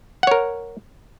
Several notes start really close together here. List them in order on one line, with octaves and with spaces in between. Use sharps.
F#5 C#5 A#4